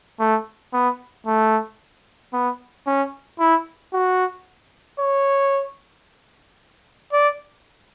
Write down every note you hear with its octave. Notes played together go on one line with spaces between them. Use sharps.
A3
B3
A3
B3
C#4
E4
F#4
C#5
D5